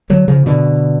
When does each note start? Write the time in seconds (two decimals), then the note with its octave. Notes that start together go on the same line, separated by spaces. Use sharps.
0.10 D3 F#3
0.28 C#3 F3
0.46 B2 D3